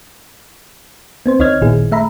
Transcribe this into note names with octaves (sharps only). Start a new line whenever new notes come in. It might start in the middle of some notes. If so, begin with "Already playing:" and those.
B3 C4 C5
D2 D#4 C#5 D#5 F6 G#6
A1 A#2 D#3 B3 E4 G#4
A3 E5 A#5 B5